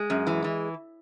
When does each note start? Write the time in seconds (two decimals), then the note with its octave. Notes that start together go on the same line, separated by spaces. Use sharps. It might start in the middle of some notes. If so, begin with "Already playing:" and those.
Already playing: G#3
0.10 F#2
0.27 E3
0.44 E3